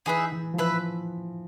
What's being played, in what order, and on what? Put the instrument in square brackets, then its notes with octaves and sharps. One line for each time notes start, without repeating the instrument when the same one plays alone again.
[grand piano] E3 [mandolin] D#4 G#4 B4 E5
[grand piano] E3
F3
[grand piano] E3 [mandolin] B4 E5